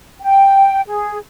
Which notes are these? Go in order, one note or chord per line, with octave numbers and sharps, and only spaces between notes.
G5
G#4